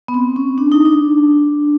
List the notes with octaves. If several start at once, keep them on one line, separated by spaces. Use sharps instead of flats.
B3
C4
C#4
D4
D#4
D4